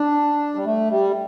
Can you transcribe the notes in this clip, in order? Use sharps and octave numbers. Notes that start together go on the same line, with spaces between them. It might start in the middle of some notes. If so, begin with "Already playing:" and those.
Already playing: D4
G3
A3
G3